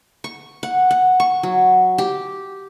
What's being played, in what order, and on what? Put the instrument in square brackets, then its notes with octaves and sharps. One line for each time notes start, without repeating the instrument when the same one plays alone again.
[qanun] C#6
F#5
F#5
C#6
F#3
G4